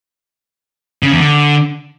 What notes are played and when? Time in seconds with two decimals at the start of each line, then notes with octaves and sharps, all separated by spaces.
1.03 C#3
1.11 E2
1.20 D3